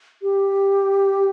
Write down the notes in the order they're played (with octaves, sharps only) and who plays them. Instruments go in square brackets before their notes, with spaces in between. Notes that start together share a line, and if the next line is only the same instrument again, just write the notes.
[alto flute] G4